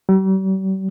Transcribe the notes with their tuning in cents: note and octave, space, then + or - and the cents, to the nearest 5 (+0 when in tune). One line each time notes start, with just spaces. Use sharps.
G3 -45